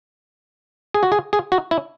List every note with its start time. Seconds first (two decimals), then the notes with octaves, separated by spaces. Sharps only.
0.94 G#4
1.03 F#4
1.12 G#4
1.33 G#4
1.52 F#4
1.71 E4